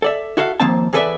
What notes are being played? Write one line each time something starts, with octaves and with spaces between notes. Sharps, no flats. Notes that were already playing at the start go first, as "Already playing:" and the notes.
A4 D5 E5
E4 F#4 A4 E5 F5
D#2 F3 A#3 C4 A5
E2 G#4 A4 B4 D5 E5